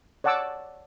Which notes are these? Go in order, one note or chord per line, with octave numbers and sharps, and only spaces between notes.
C#5 D5 F#5 A5 D6 E6